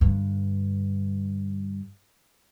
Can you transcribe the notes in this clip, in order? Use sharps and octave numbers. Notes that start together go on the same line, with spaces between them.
G2 D3